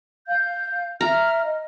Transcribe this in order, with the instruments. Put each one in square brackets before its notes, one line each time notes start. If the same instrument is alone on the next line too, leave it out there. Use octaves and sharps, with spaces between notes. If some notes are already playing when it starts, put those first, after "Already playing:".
[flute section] F5 G6
[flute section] E5 F6 [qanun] A#5
[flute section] D#5